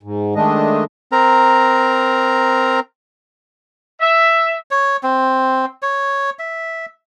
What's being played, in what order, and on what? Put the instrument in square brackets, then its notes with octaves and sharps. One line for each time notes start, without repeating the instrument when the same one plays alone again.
[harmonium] G#2
D#3 G#3 A3 D4 D#5
[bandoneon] C4 A#4 A#5
[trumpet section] E5
[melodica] C#5
C4
C#5
E5